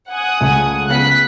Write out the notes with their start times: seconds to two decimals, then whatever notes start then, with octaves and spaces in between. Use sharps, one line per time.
0.11 F#5 G#5 D#6
0.41 C#2 A3
0.89 C#3 B3 F#6 B6